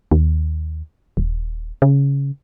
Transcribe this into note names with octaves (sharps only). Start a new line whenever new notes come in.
D#2
D#1
C#3